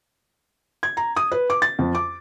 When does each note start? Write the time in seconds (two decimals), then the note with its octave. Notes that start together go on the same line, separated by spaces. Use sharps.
0.83 G#6
0.97 A#5
1.16 D#6
1.32 B4
1.50 D6
1.62 A6
1.79 F2
1.95 D6